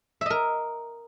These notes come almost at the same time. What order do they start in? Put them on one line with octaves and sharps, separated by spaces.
E5 D#5 A#4